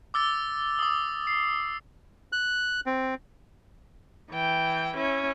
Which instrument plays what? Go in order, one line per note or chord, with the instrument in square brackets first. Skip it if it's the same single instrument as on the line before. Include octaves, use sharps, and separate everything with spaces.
[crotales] D6 E6 A6 G7
D6 D#6
C7
[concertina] F#6
C4
[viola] E3 G5
C#4 E4